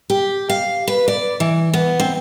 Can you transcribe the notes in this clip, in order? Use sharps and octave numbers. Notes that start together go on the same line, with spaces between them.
G4
F5
B4
D5
E3
B3
C4